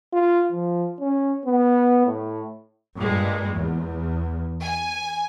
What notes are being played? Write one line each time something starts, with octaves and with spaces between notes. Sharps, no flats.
F4
F3
C#4
B3
A2
G2 A#2 G#3
E2
G#5